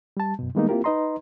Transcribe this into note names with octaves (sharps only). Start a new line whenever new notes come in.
G3 A5
F#2 B2
D#3 G3 G#3 A#3 B3 D#4
A#3 C4 E4 F4 G4 A#4
D#4 B4 D#5 A#5 C6